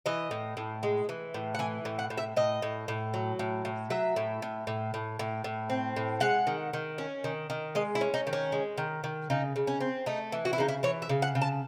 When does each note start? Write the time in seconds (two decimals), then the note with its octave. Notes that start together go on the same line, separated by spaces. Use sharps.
0.06 E3 D#5
0.31 A2
0.57 A2
0.83 G#3
1.09 E3
1.34 A2
1.55 F#5
1.59 E3 G#5
1.85 A2
1.99 F#5
2.10 A2
2.18 E5
2.36 A2 D#5
2.62 A2
2.88 A2
3.14 F#3
3.39 A2
3.65 A2
3.90 F#3 E5
4.16 A2
4.42 A2
4.67 A2
4.94 A2
5.19 A2
5.44 A2
5.70 C4
5.96 A2
6.21 G#3 F#5
6.47 D#3
6.73 D#3
6.98 C#4
7.24 D#3
7.50 D#3
7.75 G#3 D#5
7.95 E4
8.01 C#4
8.14 D#4
8.27 D#3
8.33 C#4
8.52 G#3
8.78 D#3
9.04 D#3
9.30 C#3 D#4
9.56 C#3
9.67 C#4
9.80 C4
10.06 A3 D#4
10.32 E3
10.45 F#4
10.53 E4
10.58 C#3 D#4
10.68 E4
10.83 E3 C#5
11.02 E5
11.09 C#3
11.22 F#5
11.35 C#3
11.42 A5